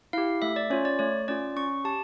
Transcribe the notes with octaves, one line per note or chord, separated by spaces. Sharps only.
E4 G4 F5
A3 E5
D5
C#4 F4 C#5
D5
A3 C#5
C#4 F4 D5
C#4 C#6
G4 A5